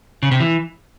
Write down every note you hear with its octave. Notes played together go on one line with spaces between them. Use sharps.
C#3
C3
E3